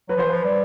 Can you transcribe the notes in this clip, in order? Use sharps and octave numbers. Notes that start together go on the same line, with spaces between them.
F#3 B4
F3
E3 C5
F3 B4
G3